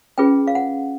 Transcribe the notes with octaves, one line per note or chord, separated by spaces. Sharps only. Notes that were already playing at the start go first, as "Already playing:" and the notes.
C#4 F4 G#4 B4 G5
F5
F#5